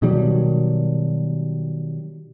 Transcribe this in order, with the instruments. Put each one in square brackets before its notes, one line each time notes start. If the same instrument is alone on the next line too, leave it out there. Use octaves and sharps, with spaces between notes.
[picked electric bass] B2 D#3 F#3 G3